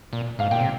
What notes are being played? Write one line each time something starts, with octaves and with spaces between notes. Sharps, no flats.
A#2
G#2 F5
A#2 G5
C3